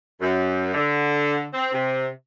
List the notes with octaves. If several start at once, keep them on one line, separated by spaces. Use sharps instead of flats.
F#2
D3
C4
C3